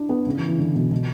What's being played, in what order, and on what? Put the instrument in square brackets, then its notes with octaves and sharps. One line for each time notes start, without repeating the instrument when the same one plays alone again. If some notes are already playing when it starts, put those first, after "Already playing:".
Already playing: [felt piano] D4 E4
B3
C#3
E3
E3
D3
B2
B2